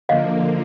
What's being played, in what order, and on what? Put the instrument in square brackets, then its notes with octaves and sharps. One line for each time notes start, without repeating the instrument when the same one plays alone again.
[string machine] D3 F3 A#3 [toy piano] D#5 F5